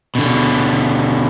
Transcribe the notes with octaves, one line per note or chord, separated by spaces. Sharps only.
B2 D3